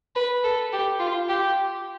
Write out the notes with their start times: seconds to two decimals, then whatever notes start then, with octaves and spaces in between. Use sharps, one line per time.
0.16 B4
0.44 A4
0.72 G4
0.99 F4
1.29 G4